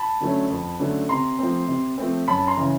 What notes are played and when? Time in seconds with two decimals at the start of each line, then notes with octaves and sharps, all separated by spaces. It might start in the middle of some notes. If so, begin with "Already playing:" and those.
Already playing: A5 B5
0.20 D3 F#3 A3 C#4
0.50 F2
0.79 D3 F#3 A3 C#4
1.09 C3 A#5 C6
1.39 F3 A3 C4
1.68 C3
1.98 F3 A3 C4
2.28 F#2 A5 B5
2.47 A#5 C6
2.57 C#3 E3